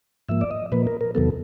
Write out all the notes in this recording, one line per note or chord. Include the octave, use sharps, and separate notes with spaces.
G#2 F3 A#3 E5
D5
D#5
A#2 F3 A#3 B4
A#4
A#4
E2 C3 D#3 F#3 B3 A4